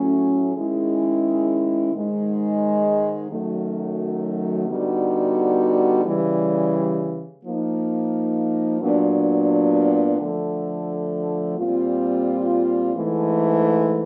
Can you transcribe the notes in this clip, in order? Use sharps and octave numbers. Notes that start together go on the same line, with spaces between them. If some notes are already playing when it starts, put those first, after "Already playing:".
Already playing: A2 F#3 A3 C#4
D#3 G#3 C#4 E4 G#4
G#2 D#3 G#3
F#2 D#3 F#3 A3
D3 G3 B3 D#4 F#4
C#3 E3 G3
F3 A#3 D#4
A#2 F#3 B3 D4
D3 F3 A3
A#2 G3 C4 F4
G#2 E3 A3